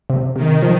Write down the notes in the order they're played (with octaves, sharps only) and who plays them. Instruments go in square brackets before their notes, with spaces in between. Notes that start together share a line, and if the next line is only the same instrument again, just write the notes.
[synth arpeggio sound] C3
[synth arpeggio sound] C3 [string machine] D#3
[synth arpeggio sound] F3